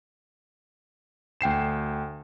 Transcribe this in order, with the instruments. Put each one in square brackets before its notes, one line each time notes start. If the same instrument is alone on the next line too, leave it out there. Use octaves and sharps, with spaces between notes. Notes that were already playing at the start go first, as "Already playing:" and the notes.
[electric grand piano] D2 G5 C7 E7